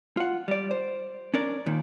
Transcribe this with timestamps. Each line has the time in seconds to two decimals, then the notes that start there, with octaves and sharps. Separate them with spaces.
0.17 F4 F#5
0.48 G3 D5
0.71 C5
1.34 C#4 D4 A#4 D5
1.66 D#2 A#2 D#3